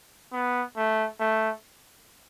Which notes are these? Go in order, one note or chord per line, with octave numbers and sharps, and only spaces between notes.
B3
A3
A3